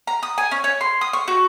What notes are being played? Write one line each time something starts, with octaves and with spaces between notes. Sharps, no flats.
A#5
D#6
G#5
C#4
C#5
C6
D#6
C#6
F#4